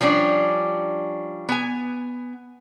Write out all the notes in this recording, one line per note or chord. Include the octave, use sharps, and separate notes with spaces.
F3 G3 C#4 D4
B3 G#5